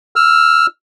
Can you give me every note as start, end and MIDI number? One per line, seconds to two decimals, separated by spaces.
0.16 0.66 88
0.16 0.66 89